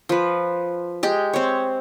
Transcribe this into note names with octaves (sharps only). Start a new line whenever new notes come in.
F3 B4
G#3 G4
C4 C#5